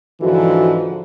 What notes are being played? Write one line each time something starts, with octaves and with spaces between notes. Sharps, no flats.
G#2 D3 E3 F3 G#3 F#4